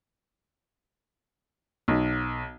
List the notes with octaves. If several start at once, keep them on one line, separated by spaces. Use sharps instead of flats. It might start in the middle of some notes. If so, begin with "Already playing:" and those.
B1